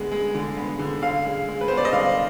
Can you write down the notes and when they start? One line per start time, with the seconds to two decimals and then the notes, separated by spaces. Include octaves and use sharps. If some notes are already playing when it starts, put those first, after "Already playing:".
Already playing: D3 G#3 B3
0.11 G#3
0.35 D3
0.57 B3
0.79 D3
1.02 D3 F5
1.25 G#3
1.48 G#3
1.61 B4
1.68 B3 C5
1.77 D5
1.85 D#5
1.93 D3 F5